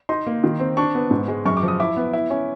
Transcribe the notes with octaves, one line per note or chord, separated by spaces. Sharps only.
D#4 C6
A#3
D#3
C4
D4 C#6
B3
G#2
G#3
F#2 C#6
D6
F3
D#6
E4 D6
B3
E4
C#4